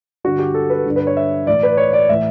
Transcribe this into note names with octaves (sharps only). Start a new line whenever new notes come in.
G2 D3 F#4
G4
A4
B4
G2 D3
B4
C#5
E5
A2 E3 D5
B4
C#5
D5
A2 E3 E5